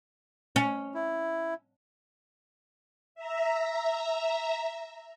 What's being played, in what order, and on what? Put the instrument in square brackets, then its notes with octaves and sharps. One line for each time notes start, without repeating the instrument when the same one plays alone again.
[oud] C#4
[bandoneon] E4
[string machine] E5 A#5